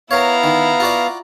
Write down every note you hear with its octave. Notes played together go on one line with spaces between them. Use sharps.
B3 E4 A#4 C#5 F5 A#5
D#3
F4 F#4 D5